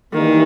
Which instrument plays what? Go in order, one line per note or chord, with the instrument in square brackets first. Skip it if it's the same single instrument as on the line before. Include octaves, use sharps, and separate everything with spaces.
[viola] D#3 [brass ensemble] E3 G3 A#3